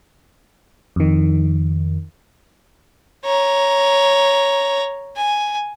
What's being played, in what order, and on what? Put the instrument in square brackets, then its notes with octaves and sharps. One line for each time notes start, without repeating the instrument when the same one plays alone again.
[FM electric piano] F2 D#3
[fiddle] C#5 A#5
G#5